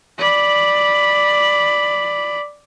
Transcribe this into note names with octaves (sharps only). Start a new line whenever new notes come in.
D5 B5